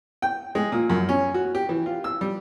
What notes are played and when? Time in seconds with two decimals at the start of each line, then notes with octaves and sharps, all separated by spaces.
0.22 G5
0.55 G#3
0.72 A#2
0.90 F#2
1.09 C#4
1.34 F#4
1.55 G4
1.69 E3
1.86 F4
2.04 E6
2.21 G3